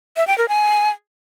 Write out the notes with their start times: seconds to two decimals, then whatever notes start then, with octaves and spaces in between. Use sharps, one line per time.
0.17 E5
0.27 G5
0.38 A#4
0.49 G#5